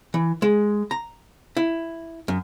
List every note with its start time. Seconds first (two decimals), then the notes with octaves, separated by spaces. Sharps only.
0.14 E3
0.42 G#3
0.91 A#5
1.57 E4
2.28 F#2